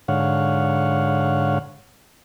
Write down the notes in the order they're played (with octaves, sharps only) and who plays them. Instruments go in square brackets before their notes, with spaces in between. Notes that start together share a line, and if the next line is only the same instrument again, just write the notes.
[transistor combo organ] G#2 D3 C#5 F5 F#5